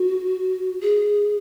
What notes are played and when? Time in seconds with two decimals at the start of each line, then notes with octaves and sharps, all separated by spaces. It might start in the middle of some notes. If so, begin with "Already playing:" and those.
Already playing: F#4
0.82 G#4